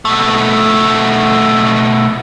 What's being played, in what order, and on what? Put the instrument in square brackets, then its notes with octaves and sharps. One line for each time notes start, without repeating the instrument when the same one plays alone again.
[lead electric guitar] B2 A3